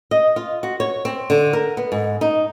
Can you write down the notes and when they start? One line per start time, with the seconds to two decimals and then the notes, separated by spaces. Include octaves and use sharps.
0.11 D#5
0.36 F4
0.63 F#4
0.80 C#5
1.05 C4
1.30 D3
1.53 A#4
1.77 B3
1.92 G#2
2.21 D#4